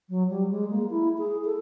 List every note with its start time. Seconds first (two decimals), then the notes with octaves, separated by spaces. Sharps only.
0.09 F#3
0.30 G3
0.51 G#3
0.70 A#3
0.90 E4
1.18 G#4
1.44 A4